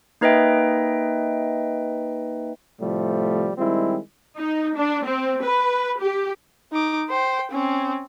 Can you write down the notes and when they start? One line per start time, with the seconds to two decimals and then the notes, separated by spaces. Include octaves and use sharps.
0.21 A#3 D#4 B4 D#5 E5 G5
2.80 A2 C3 F3 G3 A3
3.58 D#3 G3 G#3 C4 E4
4.38 D#4
4.75 D4
5.05 C4
5.42 B4
6.00 G4
6.72 D#4 D6
7.10 C5 G5
7.52 C4 C#4